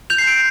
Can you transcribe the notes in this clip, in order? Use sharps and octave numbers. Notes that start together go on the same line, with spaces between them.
G6 F7
C7
G6 D7